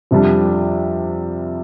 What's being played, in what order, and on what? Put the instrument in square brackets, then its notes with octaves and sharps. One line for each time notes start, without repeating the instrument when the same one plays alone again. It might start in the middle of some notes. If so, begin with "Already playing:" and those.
[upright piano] F2 C3 G3 D4